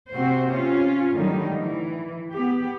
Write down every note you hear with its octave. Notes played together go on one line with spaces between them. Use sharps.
C3 A#3 C4 F#4 C5
C#4 F4
A2 D3 D#3 F#3 G3 D#4
E3
B3 G4